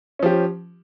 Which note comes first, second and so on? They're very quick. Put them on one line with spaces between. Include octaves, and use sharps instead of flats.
C#4 F3 G4